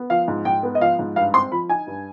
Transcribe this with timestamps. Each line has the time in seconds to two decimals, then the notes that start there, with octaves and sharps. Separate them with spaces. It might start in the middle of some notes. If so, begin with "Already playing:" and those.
Already playing: B3
0.10 F3 F5
0.28 G#2
0.45 G#2 G5
0.63 B3
0.75 D#5
0.81 F3 F5
0.99 G#2
1.16 G2 F5
1.34 C4 C6
1.52 F3 B5
1.69 D#4 G#5
1.87 G2